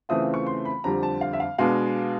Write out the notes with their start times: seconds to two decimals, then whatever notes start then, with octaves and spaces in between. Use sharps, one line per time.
0.09 C#3 E3 A3 C4 F4 D#6
0.34 C#6
0.47 C6
0.65 B5
0.84 F2 D3 G3 C4 A#5
1.03 A5
1.21 F5
1.33 E5
1.40 F5
1.58 B2 G#3 B3 D4 F5